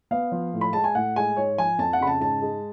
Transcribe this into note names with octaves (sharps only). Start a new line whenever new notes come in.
B3 F5
F3
A2
B5
G#3 A5
G#5
A2 F#5
G#3 G#5
G#2 C#5
F3 G#5
F2 A5
F#5
C#3 B5
A5
G#2 A5
G#3